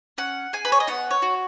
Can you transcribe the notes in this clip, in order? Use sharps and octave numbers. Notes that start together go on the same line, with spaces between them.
C#4 F#5
G#4 G#5
B4
C#5
D#5
B3 F#5
C#5
F#4